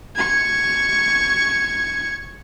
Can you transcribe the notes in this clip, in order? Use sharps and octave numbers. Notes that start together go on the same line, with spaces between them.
C#6 G#6